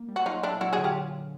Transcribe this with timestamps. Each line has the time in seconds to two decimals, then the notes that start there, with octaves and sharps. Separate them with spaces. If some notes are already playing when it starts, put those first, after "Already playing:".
Already playing: A#3
0.08 G3
0.16 F#4
0.26 F#3 D#4 F4
0.43 A#2 D4 E4
0.61 F#3 E4 F#4
0.73 F#4 G#4
0.78 D3
0.84 F4 G4